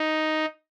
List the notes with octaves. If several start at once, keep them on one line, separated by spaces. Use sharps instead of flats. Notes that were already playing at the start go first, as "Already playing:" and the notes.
Already playing: D#4